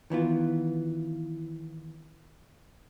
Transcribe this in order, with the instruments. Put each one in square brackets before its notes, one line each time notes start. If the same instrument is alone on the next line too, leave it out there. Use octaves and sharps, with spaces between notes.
[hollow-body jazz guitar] D#3 E3 B3 F4